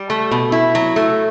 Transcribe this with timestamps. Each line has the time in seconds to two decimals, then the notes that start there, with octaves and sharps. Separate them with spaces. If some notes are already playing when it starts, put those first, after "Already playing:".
Already playing: G3
0.10 A3
0.31 B2
0.52 E4
0.75 F#3
0.96 A3